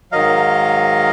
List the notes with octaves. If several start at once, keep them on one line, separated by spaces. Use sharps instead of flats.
G#2 D#3 F#3 D#5 F5